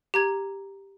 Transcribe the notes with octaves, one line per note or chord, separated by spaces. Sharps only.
G4 A#5 G#6